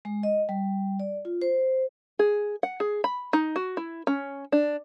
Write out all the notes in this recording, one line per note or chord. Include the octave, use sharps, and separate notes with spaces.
G#3
D#5
G3
D5
F4
C5
G#4
F#5
G#4
B5
D#4
F#4
E4
C#4
D4